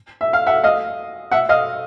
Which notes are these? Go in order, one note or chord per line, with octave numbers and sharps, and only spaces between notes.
E5
F5
E5 F#5
D#5 F5
E5 F#5
D#5 F5